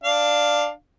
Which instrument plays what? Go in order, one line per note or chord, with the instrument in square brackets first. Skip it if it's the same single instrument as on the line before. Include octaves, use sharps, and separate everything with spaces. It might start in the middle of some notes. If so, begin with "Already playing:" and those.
[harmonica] D4 F5